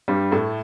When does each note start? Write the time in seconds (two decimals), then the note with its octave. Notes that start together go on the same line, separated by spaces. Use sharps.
0.08 G2 G3
0.31 A2 A3